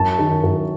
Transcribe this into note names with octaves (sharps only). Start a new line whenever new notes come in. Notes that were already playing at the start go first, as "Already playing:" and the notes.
Already playing: F#2 A5
D#3
F#2